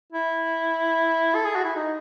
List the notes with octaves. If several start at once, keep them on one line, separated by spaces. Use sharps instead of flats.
E4
A4
G#4
F#4
E4
D#4